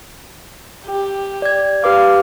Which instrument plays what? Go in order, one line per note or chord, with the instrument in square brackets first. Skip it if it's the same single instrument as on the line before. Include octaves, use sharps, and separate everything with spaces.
[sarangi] G4
[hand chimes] D5 G#6
[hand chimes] G4 B4 D6 [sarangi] F5